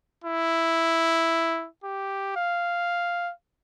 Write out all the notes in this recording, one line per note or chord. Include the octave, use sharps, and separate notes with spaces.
E4
G4
F5